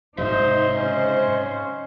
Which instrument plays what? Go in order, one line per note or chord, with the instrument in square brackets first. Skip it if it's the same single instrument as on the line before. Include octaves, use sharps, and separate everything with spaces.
[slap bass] G#2 C3 F#3 [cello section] D#4 [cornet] C5 [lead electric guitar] D#5 E5
[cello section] C#3 C5 [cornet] C#4